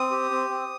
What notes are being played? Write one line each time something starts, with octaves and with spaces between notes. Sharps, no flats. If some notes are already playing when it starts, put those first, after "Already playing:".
Already playing: C4 D#6
G4
C4
C4